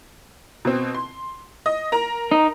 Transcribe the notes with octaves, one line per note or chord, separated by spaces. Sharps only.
B2 C4
C6
D#5
A#4 A#5
D#4